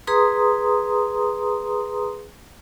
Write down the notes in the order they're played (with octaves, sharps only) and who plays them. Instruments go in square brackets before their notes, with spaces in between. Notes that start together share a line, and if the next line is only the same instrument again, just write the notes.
[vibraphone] G#4 B4 A#5 C6 D#6